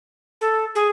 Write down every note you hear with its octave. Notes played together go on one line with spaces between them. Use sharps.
A4
G#4